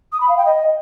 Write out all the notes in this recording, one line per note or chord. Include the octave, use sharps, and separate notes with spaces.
D#6
B5
F5
G5
D#5